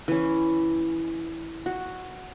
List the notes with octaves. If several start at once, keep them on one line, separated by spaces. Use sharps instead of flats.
E3 C#4
F#4